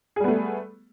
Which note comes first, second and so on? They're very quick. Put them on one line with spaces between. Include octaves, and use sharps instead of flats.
G#4 G3 B3 A3